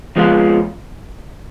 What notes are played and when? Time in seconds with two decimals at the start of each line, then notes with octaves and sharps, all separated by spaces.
0.16 F2 F3 G#3 B3 F4